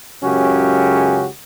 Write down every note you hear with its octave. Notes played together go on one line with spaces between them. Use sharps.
C#2 F#2 C#3 C#4 F#4 G4